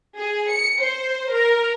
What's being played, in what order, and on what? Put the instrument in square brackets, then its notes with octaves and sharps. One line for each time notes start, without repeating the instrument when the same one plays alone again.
[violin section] G#4
C#7
C5
A#4